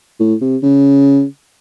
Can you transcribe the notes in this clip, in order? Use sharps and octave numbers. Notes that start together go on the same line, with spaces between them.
A2
C3
C#3